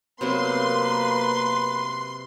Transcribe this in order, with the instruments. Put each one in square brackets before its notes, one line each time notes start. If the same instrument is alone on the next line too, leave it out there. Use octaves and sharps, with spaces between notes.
[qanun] C3 F#3 B3 [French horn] A#3 [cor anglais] B4 [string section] C6